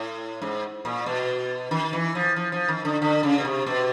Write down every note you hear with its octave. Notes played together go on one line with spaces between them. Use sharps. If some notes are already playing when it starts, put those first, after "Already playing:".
Already playing: A2
G#2
A#2
B2
D#3
E3
F3
F3
F3
D#3
D3
D3
C#3
B2
C3
B2